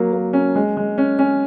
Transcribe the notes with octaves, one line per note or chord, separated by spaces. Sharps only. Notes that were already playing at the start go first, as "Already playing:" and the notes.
Already playing: F#3 A#3
A#3
C#4
G#3
G#3
C#4
C#4